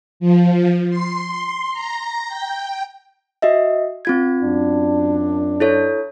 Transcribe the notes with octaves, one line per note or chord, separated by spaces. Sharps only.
F3
C6
A#5
G5
F#4 D#5 E5
C4 F4 G#6
F#2 D4
E4 A4 C#5